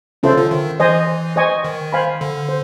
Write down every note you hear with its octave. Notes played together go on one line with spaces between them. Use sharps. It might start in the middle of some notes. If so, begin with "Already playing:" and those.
C#3 C#4 F4 A4 C5 E5
D3
D#3
E3 C5 D#5 G#5
C5 D#5 G#5 C#6
D#3
C5 F5 G#5 B5
D3
C5